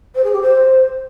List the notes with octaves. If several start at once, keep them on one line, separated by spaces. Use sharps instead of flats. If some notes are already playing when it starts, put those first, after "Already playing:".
C5
G#4
G4
C5